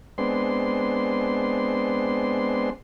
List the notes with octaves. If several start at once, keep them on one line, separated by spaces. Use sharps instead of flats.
G#3 B3 C4 D4 C6